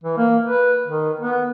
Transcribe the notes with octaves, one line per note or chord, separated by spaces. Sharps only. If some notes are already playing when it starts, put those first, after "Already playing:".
E3
A#3
B4
D#3
B3